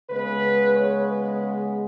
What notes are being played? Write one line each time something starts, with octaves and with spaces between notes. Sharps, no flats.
C#3 G#3 B3 B4
C#5
B4